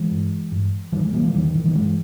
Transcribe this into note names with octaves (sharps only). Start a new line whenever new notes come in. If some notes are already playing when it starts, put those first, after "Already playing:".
Already playing: E3 G#3
G2
G2
E2 D#3 G3
E3 G#3
B2 G3 A#3
E3 G#3
E2 D#3 G3
D#3
B2 E3
D#3 G3
G2 E3 G#3